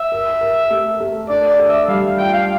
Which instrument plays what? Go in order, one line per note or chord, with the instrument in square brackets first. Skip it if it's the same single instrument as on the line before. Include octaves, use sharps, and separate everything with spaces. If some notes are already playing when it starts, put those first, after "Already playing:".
Already playing: [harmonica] E5
[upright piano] A#4
A#4
A3
A3
[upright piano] D4 [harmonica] D5
[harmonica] D5
[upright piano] A4
[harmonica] E5
[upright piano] G3 [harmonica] F5
[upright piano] F4 [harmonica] G5
[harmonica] F5